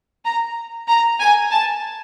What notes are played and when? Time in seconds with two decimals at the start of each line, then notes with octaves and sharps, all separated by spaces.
0.25 A#5
0.88 A#5
1.19 G#5
1.51 A5